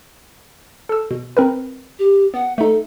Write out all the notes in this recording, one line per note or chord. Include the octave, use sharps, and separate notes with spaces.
A4 E6
B2
C4 A#4 B4
G4
B3 F#5
A3 D#4 A4